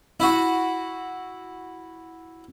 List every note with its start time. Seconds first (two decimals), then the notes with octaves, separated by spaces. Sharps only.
0.20 E4 F#4